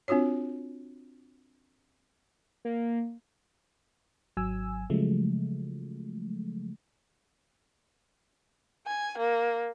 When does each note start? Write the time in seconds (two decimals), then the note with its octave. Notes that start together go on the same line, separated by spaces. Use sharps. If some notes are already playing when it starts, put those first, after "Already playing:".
0.08 C4 D4 F4 F#4 C#5
2.65 A#3
4.37 G#1 F#3 G#5 E6
4.90 C#3 F3 F#3 G#3 A3
8.86 G#5
9.18 A#3